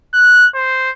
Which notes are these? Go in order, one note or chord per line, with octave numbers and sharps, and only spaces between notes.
F#6
C5